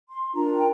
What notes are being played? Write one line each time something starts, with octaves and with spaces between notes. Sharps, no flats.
C6
D4 F4 A#4 A#5
G5